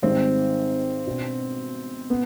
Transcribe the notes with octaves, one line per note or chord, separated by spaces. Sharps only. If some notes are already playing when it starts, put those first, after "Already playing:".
G#1 G#2 D#3 G3 C4
B2 B3 D4
B3